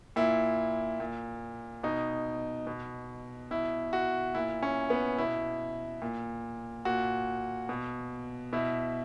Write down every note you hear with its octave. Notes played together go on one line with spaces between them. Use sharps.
A#2 E4
A#2
B2 D#4
B2
B2 E4
F#4
A#2 E4
C#4
B3
B2 E4
A#2
A#2 F#4
B2
B2 E4